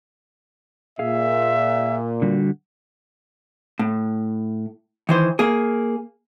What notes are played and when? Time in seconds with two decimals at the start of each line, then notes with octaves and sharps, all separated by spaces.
0.99 A#2 G#4 E5 F5
2.22 D3 G3 F#4
3.79 A2
5.09 D#3 E3 C5
5.39 A#3 G#4